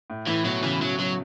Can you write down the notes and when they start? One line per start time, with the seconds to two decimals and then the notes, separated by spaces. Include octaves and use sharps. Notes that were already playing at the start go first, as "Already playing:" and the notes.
0.10 A2
0.27 A2 E3
0.45 B2 F#3
0.63 C#3 E3
0.82 F#3
0.99 F#3